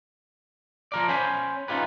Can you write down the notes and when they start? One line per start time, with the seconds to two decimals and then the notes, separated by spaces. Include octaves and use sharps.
0.92 F3 A#4 D5
1.08 C#4 C5 G#5 B5
1.68 C#4 D#4 F4 G4 B4